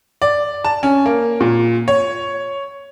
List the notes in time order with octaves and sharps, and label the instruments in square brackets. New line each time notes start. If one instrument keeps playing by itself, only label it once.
[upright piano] D5
A5
C#4
A#3
A#2
C#5